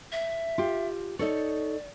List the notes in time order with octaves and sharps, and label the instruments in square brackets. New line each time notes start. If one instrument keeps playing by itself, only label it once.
[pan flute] E5
[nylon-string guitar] F4 G4
[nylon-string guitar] D#4 A4 C#5 [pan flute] D5